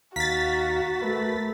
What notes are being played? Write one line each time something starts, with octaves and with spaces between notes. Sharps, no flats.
D#2 F#4 F5 A#5 A6 B6
A3 A#4 B4